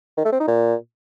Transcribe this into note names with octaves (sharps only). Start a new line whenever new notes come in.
D#3
A3
C4
D#4
A#2